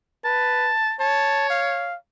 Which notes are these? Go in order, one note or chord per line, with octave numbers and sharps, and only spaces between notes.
B4 A5
C#5 A5
F5